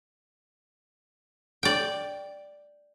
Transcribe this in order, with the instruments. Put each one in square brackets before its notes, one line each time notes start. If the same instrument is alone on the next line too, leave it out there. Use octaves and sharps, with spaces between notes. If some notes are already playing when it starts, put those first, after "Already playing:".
[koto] D5 G5